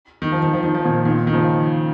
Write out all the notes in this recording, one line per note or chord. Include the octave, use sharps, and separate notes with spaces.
D#3
F3
D#3
F3
D#3
F3
A#2 D#3
A#2 D#3
D#3
C#3 F3